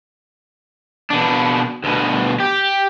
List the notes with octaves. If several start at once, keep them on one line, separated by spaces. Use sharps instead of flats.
B2 D4
D2 B2
G4